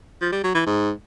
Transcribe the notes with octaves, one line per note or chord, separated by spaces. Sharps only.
F3
G3
F#3
E3
G#2